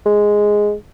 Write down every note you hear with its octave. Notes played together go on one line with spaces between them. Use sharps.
G#3